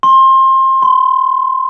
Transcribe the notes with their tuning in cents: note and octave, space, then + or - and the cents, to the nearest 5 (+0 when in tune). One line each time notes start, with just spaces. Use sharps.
C6 +25
C6 -40